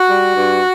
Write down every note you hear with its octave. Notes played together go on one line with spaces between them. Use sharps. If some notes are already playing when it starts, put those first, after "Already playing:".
Already playing: F#4
G3
G2